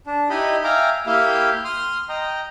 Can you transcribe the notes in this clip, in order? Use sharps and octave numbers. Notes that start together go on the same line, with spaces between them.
D4
D#4 E4 G4 D#5 B5
E5 F5 G5 G#5 A#5 D6
A#3 E4 G4 E5 F5 G5
C6 D#6 F6
D#5 G5 A#5